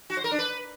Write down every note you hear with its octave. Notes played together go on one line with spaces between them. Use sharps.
F#4
C5
A#4
D4
B4